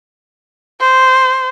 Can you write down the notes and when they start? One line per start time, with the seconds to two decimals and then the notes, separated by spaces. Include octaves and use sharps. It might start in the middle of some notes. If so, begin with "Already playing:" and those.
0.81 C5